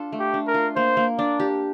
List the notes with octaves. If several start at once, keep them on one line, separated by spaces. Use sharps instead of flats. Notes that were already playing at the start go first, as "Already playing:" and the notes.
Already playing: D4 F4 A4
A3
G4
D4
A#4
F4
A#3 C5
A#3
D4 D5
G4